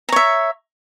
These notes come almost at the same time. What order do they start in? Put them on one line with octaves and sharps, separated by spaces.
A#5 C#5 E5